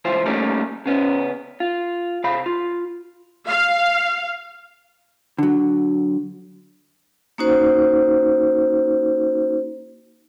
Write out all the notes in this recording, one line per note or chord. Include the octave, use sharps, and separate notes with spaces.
C#2 E3 F4 C5
G3 A3 A#3 C#4 D#4
C#3 B3 C#4
F4
C3 F5 B5
F4
F5
D3 F#3
A#3 C#4 D#4 F#4 C5